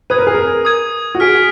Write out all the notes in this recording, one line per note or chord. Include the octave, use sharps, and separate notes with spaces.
B4 D#6 G#6 D#7
A#4
G#4
A#4
D#6 G#6 D#7
F#4
G#4 F6 B6 D7